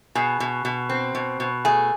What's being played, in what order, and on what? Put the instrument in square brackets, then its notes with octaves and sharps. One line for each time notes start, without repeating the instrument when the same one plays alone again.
[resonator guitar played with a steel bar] B2 [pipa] G#4
[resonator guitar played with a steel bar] B2
B2
C4
B2
B2
[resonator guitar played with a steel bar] A3 [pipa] G#4